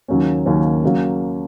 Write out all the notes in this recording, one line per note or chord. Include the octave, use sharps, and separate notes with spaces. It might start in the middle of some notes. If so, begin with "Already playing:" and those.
D#2 C#3 F#3 A#3 C#4
D#2 C#3 F#3 A#3 C#4
C#3 F#3 A#3